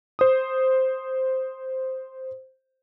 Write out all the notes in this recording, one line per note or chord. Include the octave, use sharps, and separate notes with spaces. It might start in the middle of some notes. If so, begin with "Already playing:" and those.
C5 D#6